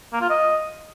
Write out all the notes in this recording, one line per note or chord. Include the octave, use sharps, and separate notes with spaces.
A#3
F4
D#5